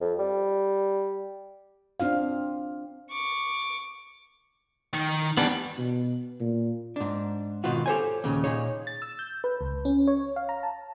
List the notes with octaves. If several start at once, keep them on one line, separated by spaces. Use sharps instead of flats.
F2
G3
C4 D4 F4 F5
C#6 D6
D#3
E3 G3 B3 D4
B2
A#2
G#2 D4
G#2 B2 D#3 C4 F4 F#4
G4 A4 A#4 C5 C#5 G#5
D#2 A#2 C#3
A#2 D#4 G#4 C#5
A6
E6
G6
B4
C#2
C#4
C#5
F5
A#5
A5